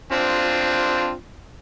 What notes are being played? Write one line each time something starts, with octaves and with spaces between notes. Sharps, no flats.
C4 D4 F4